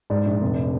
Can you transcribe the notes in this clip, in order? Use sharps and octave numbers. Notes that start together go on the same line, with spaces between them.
G#2 D5
A#1
F1